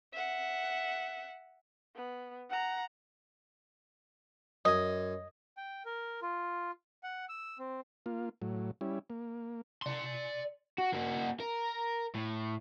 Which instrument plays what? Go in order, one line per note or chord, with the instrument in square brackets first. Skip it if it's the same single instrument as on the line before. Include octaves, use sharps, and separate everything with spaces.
[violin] E5 F#5
[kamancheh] B3
F#5 A#5
[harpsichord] F#2 G#5 [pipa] D#5
[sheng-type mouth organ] G5
A#4
F4
F#5
E6
C4
[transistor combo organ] A#3 F4
A2 F#3
G3 C#4 E4
A#3
[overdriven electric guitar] D5 C6
F#4
A#3 F#4
A#4
A2